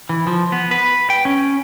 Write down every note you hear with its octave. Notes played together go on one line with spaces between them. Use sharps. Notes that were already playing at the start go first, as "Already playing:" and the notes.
E3
F3
B3
B4
G5
C#4